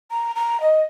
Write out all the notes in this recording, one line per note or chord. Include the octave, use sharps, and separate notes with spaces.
A#5
A#5
D#5